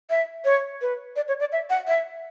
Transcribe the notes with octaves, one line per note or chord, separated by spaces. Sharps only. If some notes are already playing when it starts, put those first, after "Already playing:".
E5
C#5
B4
D5
C#5
D5
E5
F#5
E5